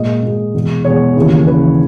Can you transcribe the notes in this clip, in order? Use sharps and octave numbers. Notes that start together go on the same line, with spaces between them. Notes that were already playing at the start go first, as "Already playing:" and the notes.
Already playing: A#2 G#3 D#5
A#2 G#3
E2 B2 G#3
E2 B2 G#3 C#5
D#2 C#3 E3
D#2 C#3 E3 B4